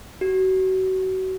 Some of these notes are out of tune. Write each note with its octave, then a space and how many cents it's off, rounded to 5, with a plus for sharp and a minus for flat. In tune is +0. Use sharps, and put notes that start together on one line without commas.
F#4 +30